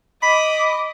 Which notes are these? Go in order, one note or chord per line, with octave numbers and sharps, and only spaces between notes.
D#5 B5 D6